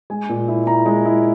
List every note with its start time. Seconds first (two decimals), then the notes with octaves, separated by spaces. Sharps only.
0.10 G#3 G#5
0.29 A#2
0.48 E4
0.67 E4 A#5
0.86 G#3
1.05 E4